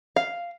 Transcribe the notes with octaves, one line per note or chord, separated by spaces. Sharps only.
F5